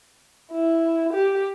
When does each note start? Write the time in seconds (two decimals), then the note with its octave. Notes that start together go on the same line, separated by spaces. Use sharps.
0.52 E4
1.13 G4